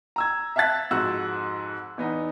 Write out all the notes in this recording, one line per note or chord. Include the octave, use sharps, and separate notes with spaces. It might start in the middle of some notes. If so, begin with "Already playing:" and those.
A#5 E6 G#6
E5 F5 A5 F#6 A6 B6
F2 G#2 F#4 E6 F#6
E2 B3 D#4